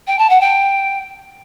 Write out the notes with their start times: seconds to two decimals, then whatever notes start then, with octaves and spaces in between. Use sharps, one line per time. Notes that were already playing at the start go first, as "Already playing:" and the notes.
0.07 G5
0.19 A5
0.30 F#5
0.41 G5